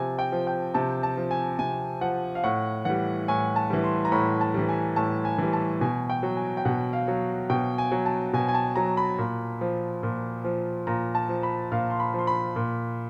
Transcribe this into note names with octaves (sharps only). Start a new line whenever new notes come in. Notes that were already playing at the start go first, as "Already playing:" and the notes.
Already playing: C3 F3 G#5 A5
G5
F3
G5
C3 A5
A5
F3
G#5
C3 G#5
F3 F#5
F5
A2 F#5
E3 G3 F#5
A2 G#5
A5
E3 G3
C6
A#5
A2 B5
A5
E3 G3
G#5
A2 A5
G#5
E3 G3
A5
B2 G#5
G5
F#3
G#5
G5
B2 F#5
F5
F#3
B2 G5
G#5
F#3
A5
B2 G#5
G#5
A5
F#3 A#5
B5
A#2
F3
A#2
F3
A#2 A#5
A5
F3
B5
A#2 F5
C6
B5
F3 C6
B5
A#2